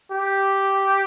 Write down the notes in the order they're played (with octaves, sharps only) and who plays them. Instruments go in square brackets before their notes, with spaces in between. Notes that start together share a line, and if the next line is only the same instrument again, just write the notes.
[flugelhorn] G4